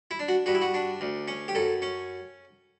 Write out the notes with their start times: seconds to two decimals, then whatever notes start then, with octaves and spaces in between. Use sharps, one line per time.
0.11 E4
0.19 D4
0.28 F#4
0.46 G2 F#4
0.55 E4
0.61 F#4
0.74 D4
1.01 D2
1.28 C#4
1.48 G4
1.55 F#2 A4
1.82 C#4